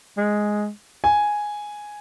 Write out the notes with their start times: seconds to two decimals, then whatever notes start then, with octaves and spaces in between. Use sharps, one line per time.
0.17 G#3
1.04 G#5